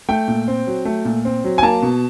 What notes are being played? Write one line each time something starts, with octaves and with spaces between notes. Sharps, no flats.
A3 G5
A#2
C4
F#3
A3
A#2
C4
F#3
G#5
A#3 A5
B2